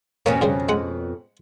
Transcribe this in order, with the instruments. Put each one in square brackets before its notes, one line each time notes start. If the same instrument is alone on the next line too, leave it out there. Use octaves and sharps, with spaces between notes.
[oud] F2 B2 C#4 [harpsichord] A#3
[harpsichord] G2 C#3 G3
G#3 F#5